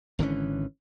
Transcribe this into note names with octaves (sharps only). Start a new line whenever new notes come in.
G#1 D3 E3 C#4